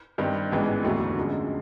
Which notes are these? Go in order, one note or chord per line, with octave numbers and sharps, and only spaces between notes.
G2 D#3 G3 C4
A1 G#2 E3 G#3 B3
F1 D#2 D3 F#3 A3
F#2 D3 F3 G#3